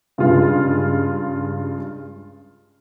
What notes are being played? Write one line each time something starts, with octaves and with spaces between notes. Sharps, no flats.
G2 C#3 G#3 F4